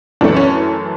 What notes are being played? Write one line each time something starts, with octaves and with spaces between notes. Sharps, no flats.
F#2 E3 A3 D4
C#4